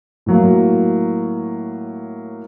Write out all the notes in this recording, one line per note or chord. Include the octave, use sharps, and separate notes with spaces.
A2 F#3 A#3